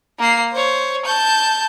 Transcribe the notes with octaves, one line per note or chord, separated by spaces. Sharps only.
A#3 C7
C5 C#5
A5 G6